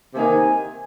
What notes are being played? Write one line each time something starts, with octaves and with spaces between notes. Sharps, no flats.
C3 D#3 A#3 G#5